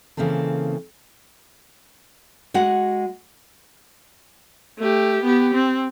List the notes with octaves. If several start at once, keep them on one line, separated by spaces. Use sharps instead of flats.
C#3 E3 A#3 C4 A4
G#3 F#4 F#5
A3 G4
B3 G4
C4